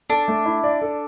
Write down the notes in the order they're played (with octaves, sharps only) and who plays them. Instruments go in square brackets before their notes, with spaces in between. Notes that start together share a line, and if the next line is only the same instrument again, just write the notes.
[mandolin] D4 [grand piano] A4
[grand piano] A3
E4
D5
A4